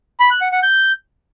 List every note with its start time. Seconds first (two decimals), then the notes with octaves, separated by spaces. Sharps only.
0.20 B5
0.31 F#6
0.41 F#5
0.52 F#5
0.63 G6